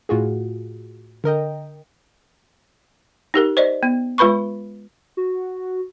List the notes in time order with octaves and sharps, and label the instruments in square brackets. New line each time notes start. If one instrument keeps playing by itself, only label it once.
[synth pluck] A2 F4 F#4 G#4
D3 A#4 D#5 G5
[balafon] D#4 G4 A#4
C5 D5 D#5
B3
G#3 F4 B4 B5 C#6
[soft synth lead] F#4